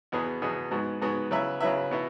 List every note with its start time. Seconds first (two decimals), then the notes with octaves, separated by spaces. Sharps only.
0.12 E2 B2 B3 G#4
0.42 E2 B2 B3 G#4
0.71 G#2 G#3 B3 F#4
1.02 G#2 G#3 B3 F#4
1.31 C#3 F#3 E4 B4 E5
1.61 C#3 F#3 E4 B4 E5
1.91 B2 B3 E4